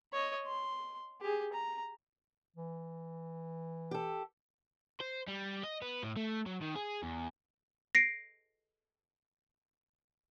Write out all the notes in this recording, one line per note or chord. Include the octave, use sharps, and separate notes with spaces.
C#5 D#5
C6
G4 G#4
A#5
E3
G4 A4
C5
G3
D#5
B3
A2
A3
F#3
D#3
G#4
E2
A#6 C7 D7